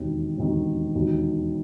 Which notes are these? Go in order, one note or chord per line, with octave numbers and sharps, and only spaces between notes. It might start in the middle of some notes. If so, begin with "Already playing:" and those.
Already playing: E1 D#2 D#3 F#3 C4
E1 D#2 D#3 F#3 C4
E1 D#2 D#3 F#3